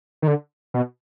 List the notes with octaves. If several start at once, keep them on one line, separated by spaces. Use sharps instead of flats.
D#3
D3
B2